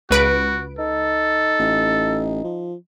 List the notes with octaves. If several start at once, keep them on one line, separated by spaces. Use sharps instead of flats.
C#2 F#4 B4 D7
D#4 A4
A1
F3